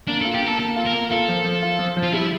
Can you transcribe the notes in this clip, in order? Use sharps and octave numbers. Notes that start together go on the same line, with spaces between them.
A#3 D4
F4 A4
G4
A#3 A4
A#3 A4
F4
A#4
A#3
F4 A4
F3
F3
F4
F3
F3
F4
G3 E4